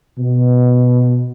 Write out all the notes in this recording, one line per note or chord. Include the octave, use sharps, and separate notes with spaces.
B2